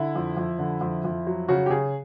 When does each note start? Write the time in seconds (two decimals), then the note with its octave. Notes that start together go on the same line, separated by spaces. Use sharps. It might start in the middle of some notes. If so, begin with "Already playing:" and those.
Already playing: D3 E4
0.15 F2
0.37 F2
0.59 D3
0.81 F2
1.04 F2
1.27 F#3
1.48 C#3 F#4
1.66 G4
1.70 C#3 G#4